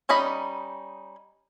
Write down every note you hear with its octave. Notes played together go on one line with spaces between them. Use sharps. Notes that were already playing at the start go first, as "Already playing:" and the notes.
G3 C#4 D#4 D#5 B5